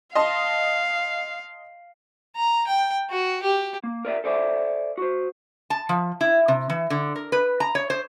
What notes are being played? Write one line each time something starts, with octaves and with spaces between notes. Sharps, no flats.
D#5 F5 A5 C6
A#5
G5
F#4
G4
A#3
A#4 D5 E5
A4 C5 D5 E5 G#5
F#4 C5
A5
F3
E4
C3
E3
D3
A#4
B4
A#5
C#5
C5